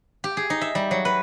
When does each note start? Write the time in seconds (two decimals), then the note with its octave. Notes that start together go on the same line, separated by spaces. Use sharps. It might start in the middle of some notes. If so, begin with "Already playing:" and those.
0.24 G4
0.37 G#4
0.50 D#4
0.61 E5
0.75 G3
0.91 F#3
1.05 B4